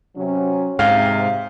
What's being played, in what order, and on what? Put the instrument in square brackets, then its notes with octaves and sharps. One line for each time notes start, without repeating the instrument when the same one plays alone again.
[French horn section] C3 F#3 C#4
[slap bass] G#2 [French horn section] C3 [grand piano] F5